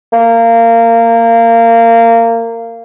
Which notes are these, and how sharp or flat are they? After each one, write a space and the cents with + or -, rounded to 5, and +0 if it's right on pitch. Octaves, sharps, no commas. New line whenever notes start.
A#3 -20